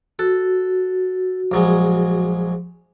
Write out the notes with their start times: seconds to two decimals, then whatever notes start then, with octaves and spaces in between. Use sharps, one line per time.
0.19 F#4 A4
1.52 A#1 F#3 G#3